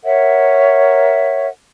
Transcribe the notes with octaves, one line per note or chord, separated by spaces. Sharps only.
A#4 C#5 E5 F#5